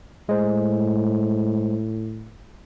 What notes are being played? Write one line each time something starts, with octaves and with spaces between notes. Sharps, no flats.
A2 G#3 C5